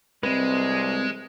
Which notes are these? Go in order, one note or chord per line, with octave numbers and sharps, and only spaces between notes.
C2 G#3 C4 B4